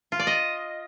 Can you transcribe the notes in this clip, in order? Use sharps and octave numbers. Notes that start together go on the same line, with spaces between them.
F4
D5
D#5